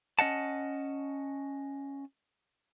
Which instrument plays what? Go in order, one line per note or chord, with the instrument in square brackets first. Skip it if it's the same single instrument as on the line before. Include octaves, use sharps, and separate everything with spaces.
[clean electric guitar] C#4 D#5 F#5 A5